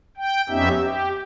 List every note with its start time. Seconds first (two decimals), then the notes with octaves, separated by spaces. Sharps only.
0.17 G5
0.49 F2 B3 C#4 D#4 G4 E5
0.81 G4